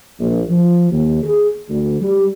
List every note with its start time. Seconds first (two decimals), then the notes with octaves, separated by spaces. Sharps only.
0.19 A#1
0.49 F3
0.92 D#2
1.23 G#4
1.69 D2
2.01 G3